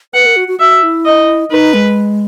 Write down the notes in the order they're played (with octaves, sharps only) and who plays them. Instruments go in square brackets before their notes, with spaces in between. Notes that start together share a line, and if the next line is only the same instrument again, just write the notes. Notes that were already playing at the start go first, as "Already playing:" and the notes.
[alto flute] B4 [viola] F#5
[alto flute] A#4
F#4
F#4
[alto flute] F#4 [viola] E5
[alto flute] E4
[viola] D#5
[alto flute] D#4 [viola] B4
[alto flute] G#3